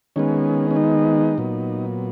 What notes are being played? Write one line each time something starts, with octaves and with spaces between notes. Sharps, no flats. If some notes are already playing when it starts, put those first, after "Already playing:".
D#3 G#3 B3 C#4
C#4
D#4
A#2 F#3 B3